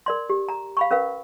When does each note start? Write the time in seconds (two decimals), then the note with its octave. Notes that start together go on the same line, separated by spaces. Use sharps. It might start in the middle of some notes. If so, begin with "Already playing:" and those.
0.06 A#4 D5 C6
0.29 G4
0.49 A#5
0.77 F5 B5 C#6
0.91 C#4 A#4 B4 F5